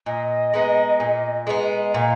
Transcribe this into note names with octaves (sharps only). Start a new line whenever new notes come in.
A#2 D#5
G#3 B3 D#4
A#2
G#3 B3 D#4
D#5
A#2 F5